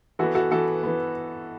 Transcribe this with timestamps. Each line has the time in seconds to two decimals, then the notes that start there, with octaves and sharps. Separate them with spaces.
0.19 E3 B3 F#4 A4
0.35 F#4 A4
0.51 E3 B3 F#4 A4
0.83 E3 B3